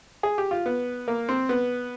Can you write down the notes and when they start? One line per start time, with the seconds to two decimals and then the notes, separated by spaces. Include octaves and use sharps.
0.23 G#4
0.38 G4
0.51 F4
0.66 B3
1.08 A#3
1.29 C4
1.49 B3